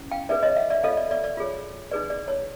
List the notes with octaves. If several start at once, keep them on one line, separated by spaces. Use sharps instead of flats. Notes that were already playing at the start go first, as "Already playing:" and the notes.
Already playing: C#4 E4
F5 G5
D#4 G#4 B4 D5 E5
C#5 D#5
E5 F#5
D5 E5
F4 A4 C#5 D#5 F5
D5 E5
D5 E5
D5
F4 G#4 C#5
D#4 G#4 B4 D5
D5
C#5